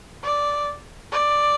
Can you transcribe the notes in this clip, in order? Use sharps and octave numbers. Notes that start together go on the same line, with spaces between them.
D5
D5